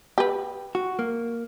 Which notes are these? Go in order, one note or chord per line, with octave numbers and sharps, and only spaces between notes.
G4 B4
F#4
A#3